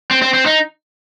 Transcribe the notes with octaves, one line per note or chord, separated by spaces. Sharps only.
C4
C4
C4
D#4